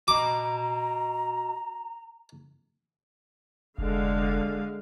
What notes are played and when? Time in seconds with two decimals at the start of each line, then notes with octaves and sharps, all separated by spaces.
0.08 F#4 D#5 A#5 D6
3.78 F1 D3 G#3 F5